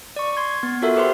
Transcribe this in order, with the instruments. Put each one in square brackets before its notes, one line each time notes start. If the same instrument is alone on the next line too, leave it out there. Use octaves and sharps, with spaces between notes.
[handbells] D5 C#6
C6 G#6
B3 A6
F4 F#4 A4 A#4 E5
G4 B4 C5 C6